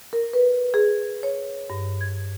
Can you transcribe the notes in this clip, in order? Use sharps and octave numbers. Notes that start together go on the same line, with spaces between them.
A#4
B4
G#4
C#5
G2
G#6